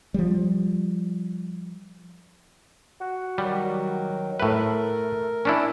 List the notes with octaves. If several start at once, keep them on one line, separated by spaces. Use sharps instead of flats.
F3 G3
F#4
D#3 F#3 G3
A2 A3 A#4 B4
C#4 D4 E4